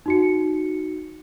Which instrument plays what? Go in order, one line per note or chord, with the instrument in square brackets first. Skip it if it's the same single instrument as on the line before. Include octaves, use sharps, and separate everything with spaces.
[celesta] D#4 F#4 C#7